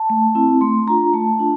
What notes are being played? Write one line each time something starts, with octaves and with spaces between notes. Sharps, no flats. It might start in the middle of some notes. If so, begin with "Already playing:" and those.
Already playing: A5
A3
C4 E4
A3 C6
D4 F4 A#5
A3 A5
D4 F4